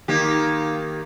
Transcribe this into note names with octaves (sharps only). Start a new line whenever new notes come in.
D#3 A#3 G4